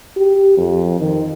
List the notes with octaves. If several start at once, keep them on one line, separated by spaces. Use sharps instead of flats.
G4
F2
D#3